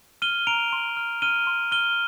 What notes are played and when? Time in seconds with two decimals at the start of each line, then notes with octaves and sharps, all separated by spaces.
0.22 F6 D#7 G7
0.47 A#5 D7 F7
0.73 C6
0.97 F6
1.22 F6 D#7 G7
1.47 C6
1.72 F6 D#7 G7